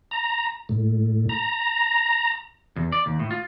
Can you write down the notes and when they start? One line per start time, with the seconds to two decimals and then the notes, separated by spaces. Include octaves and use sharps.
0.11 A#5
0.69 A2
1.29 A#5
2.76 E2
2.92 D5
3.06 D#2
3.19 A2
3.31 F4